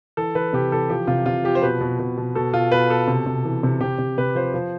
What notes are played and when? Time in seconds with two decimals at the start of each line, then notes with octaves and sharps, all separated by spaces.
0.17 E3 A4
0.35 E3 B4
0.53 C3 G4
0.72 E3 A4
0.90 F3 G4
1.07 C3 F4
1.26 C3 F4
1.45 F3 G4
1.55 C5
1.62 B2 B4
1.81 B2
1.99 B2
2.17 B2
2.35 B2 A4
2.54 B2 F4
2.72 B2 B4
2.89 B2 A4
3.08 C3
3.26 C3
3.45 E3
3.63 C3
3.81 C3 G4
3.99 C3
4.18 C3 B4
4.35 F3 C5
4.54 F3